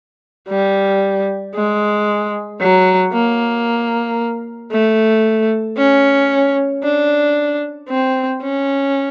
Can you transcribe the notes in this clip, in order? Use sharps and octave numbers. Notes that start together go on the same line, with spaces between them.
G3
G#3
F#3
A#3
A3
C#4
D4
C4
C#4